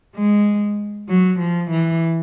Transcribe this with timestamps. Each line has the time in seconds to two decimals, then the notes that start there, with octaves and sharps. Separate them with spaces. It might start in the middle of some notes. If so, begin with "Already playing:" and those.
0.16 G#3
1.09 F#3
1.39 F3
1.70 E3